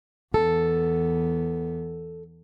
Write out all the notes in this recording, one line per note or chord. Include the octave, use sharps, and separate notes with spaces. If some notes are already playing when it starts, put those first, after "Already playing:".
E2 B3 A4